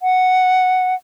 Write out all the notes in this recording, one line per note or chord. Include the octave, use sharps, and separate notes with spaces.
F#5